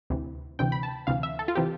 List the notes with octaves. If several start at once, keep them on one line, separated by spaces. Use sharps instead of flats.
D2 C3 E3
D2 C3 E3 G5
B5
A5
D2 C3 E3 F5
E5
A4
F4
C3 E3 G4